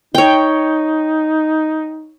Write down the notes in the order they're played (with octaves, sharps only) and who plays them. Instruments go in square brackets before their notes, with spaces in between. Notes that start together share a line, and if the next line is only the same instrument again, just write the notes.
[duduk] D#4 [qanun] C#5 G5